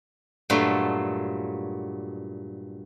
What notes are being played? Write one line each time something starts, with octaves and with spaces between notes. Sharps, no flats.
G2 A#2 F#3 A3 F4 A4